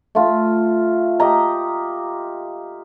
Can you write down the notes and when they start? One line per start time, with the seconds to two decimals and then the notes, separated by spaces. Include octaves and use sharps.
0.15 A3 F4
1.20 G4 D#5 A#5